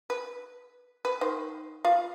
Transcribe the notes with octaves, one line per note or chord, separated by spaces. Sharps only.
B4
B4
D#3 C5
F4 F5